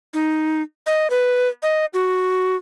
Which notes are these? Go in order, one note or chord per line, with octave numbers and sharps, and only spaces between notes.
D#4
D#5
B4
D#5
F#4